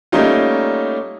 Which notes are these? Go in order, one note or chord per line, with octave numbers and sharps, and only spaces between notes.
G3 A3 A#3 C#4 D#4 F4